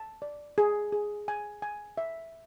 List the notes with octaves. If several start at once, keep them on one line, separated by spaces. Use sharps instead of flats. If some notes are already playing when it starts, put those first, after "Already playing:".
Already playing: A5
D5
G#4
G#4
G#5
G#5
E5